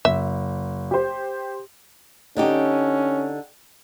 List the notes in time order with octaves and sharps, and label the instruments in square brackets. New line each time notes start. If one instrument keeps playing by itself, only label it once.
[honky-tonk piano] F#1 [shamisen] E5
[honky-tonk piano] G4 C5
[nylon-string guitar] D3 D#4 G4 [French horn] C#4